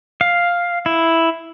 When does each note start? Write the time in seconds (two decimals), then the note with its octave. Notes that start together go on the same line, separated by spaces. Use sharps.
0.21 F5
0.86 E4